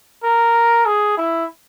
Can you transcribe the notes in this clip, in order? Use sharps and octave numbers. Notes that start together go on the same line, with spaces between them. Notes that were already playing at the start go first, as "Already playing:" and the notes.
A#4
G#4
E4